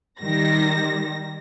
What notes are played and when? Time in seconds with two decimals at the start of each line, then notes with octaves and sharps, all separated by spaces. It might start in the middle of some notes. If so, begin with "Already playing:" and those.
0.20 D#3 G3 A#6